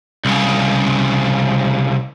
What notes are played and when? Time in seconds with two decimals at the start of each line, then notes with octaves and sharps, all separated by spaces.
0.25 C2 C#3